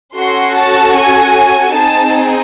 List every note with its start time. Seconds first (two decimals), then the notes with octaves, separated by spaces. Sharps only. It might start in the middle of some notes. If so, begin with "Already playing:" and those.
0.16 C#4 F#4 A4 C6
0.56 A5
0.95 G#5
1.74 C4 D#4 G#4 A5